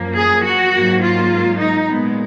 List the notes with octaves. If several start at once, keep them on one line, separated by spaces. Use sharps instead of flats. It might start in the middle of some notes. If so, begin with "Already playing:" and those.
Already playing: F#2 F3 A#3
G#4
F#4
G#2 F#3 A#3
F4
D#4
A#2 G#3 B3